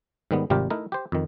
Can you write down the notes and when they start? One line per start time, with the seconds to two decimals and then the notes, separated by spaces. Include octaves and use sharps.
0.31 G#2 D#3 G3 B3
0.50 G#1 C3 G3 F4 G4 A#4
0.70 A3 D#4 E4 A#4
0.92 G4 C5
1.12 F2 D#3